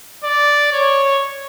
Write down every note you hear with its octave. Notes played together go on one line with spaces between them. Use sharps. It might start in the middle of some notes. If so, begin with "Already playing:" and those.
D5
C#5